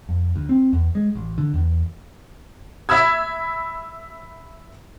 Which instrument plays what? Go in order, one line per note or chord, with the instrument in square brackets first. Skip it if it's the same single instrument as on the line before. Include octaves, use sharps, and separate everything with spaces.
[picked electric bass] F2
D2
C4
E2
G#3
A1
D3
E2
[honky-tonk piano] E5 B5 E6 G#6